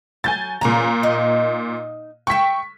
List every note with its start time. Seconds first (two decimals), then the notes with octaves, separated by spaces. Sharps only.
0.24 F#3 G#5 G6 A6
0.61 A#2 E3 C#4 G#4 A#5
1.03 D#4 D#5
2.27 E5 G5 C#6 B6